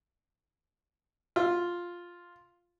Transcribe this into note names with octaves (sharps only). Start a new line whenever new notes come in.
F4